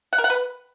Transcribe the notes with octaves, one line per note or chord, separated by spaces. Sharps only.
F#5
A#4
F#5
B4